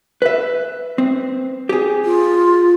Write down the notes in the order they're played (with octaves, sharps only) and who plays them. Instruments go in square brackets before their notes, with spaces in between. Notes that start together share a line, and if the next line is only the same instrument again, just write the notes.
[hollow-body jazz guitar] B4 E5
C4
G4 G#4
[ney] F4